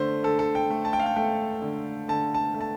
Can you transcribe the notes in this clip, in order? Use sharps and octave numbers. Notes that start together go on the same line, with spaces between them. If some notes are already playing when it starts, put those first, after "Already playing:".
Already playing: D3 A3 C5
D3 A4
A4
G5
A3
A5
G5
F5
G5
A3 G5
D3
D3 A5
A5
A3
A5